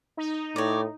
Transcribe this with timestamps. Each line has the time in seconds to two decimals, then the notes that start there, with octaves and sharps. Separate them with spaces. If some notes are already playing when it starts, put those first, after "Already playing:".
0.17 D#4
0.56 A2 C#5 D5